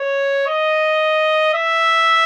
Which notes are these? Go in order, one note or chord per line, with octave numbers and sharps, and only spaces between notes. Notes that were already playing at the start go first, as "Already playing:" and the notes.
Already playing: C#5
D#5
E5